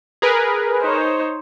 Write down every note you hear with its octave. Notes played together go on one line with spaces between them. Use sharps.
G#4 A#4 B4
D#4 C5 C#5